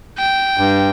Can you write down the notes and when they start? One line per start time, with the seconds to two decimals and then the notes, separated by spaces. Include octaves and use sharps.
0.18 G5
0.58 G2